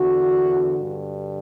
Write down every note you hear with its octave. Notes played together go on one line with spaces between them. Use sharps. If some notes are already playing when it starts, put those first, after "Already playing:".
Already playing: E2 D3 F#4
G2 D3